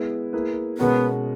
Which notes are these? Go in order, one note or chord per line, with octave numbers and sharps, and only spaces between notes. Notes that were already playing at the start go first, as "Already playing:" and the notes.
Already playing: G#3 B3 E4 G#4 B4
A#3 E4 G#4 B4
B2 G#3 B3 C#4 F#4 A#4